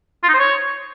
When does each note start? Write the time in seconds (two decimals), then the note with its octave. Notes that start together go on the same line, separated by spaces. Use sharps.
0.23 F4
0.29 D#4
0.34 C5
0.39 C#5